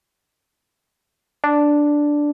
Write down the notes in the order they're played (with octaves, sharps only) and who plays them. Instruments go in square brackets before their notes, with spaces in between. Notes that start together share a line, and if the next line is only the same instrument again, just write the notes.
[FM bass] D4